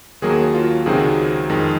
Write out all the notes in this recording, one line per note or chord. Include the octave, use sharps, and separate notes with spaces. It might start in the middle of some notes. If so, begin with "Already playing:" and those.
D#2 D#3 F#3 A#3 G#4
F4
C#2 C3 D#3 F#3 C4 G#4
F2 D#3 G#3